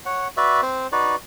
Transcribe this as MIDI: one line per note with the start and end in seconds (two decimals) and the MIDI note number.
0.06 0.28 73
0.06 0.28 78
0.37 0.61 66
0.37 0.61 71
0.37 0.61 74
0.37 0.61 76
0.62 0.87 60
0.62 0.87 72
0.92 1.16 63
0.92 1.16 66
0.92 1.16 71
0.92 1.16 74